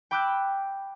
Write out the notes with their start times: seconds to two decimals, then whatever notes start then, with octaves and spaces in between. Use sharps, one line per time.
0.11 G5 B5 D6 E6 F#6 G6